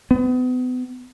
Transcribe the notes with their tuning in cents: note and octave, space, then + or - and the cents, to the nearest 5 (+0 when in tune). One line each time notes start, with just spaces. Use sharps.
B3 +35